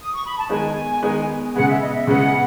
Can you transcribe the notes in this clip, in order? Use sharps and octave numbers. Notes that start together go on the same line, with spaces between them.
D#6
C#6
B5
A5
D#3 G#3 B3 D#4 G#5
D#3 G#3 B3 D#4
C#3 G#3 B3 F#5
E5
D#5
E5
C#3 G#3 B3 F#5